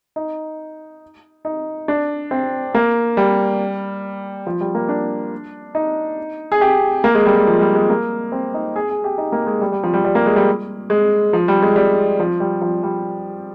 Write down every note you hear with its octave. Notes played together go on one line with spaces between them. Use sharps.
D#4
D#4
D4
C4
A#3
G3
F3
G3
A#3
D4
D#4
G#4
G4
A#3
G#3
G3
G3
F3
G3
G#3
A#3
C4
D#4
G#4
G#4
G4
D#4
A#3
G#3
G3
G3
F3
G3
G3
A#3
G#3
G3
G#3
F3
G3
G#3
G3
F3
G3
F3
G3